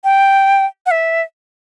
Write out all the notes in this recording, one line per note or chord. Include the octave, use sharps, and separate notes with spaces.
G5
F#5
E5